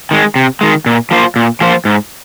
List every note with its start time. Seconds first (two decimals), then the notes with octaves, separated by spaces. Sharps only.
0.11 D#3 G#3
0.36 C3
0.61 D#3 G#3
0.86 A#2
1.11 F3 A#3 F4 C5
1.36 A#2
1.61 F3 A#3 F4 C5
1.85 G#2